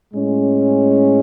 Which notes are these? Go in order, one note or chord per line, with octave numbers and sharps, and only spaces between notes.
A2 G#3 C#4